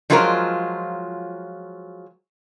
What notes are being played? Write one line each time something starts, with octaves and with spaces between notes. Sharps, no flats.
F3 F#3 G#3 F4 A#4 C5